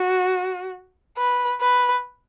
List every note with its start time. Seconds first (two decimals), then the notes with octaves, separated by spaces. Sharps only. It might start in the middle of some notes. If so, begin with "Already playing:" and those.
Already playing: F#4
1.18 B4
1.61 B4